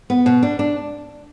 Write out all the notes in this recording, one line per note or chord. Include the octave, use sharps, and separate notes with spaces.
B3
B2
D4
D4